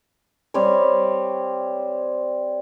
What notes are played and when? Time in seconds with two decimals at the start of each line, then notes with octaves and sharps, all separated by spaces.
0.54 G3 C4 C5 C#5